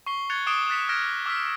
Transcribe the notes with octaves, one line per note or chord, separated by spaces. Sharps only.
C#6 C7 G7
F#6 G#6 A6 C#7 F7 G7
D6 D#6 C7 D7 E7 G7
F#6 A6 B6 C#7 E7
F6 F#6 G#6 A#6 D7
D6 E6 F6 B6